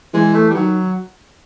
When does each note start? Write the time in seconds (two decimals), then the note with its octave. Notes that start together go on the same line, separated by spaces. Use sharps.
0.14 E3 G#3
0.35 A3
0.50 G3
0.55 D#3 F#3